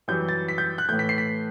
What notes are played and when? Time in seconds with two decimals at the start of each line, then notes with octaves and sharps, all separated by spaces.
0.08 F#2 E3 G3 G6
0.29 A6
0.48 B6
0.58 G6
0.78 F#6
0.88 A2 E3 A3 G6
0.99 B6
1.09 C7
1.18 B6